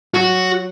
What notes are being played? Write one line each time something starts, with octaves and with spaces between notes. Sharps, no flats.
F#3 F#4